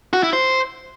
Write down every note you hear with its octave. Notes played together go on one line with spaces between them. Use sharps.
F#4
E4
C5